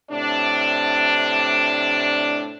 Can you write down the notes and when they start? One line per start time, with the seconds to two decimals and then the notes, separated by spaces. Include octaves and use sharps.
0.11 A2 C3 D4